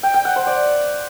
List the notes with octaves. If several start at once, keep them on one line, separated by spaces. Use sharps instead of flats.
G5
G5
F#5
C5
D5